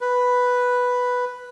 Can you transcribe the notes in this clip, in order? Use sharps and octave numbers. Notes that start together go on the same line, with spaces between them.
B4